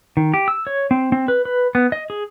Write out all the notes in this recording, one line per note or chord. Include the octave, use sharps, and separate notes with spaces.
D#3
G4
E6
C#5
C4
C4
B4
B4
B3
D#5
G#4